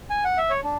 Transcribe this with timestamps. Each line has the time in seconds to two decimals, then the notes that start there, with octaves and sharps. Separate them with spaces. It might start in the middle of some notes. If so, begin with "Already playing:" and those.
0.10 G#5
0.24 F#5
0.38 E5
0.50 C#5
0.64 D4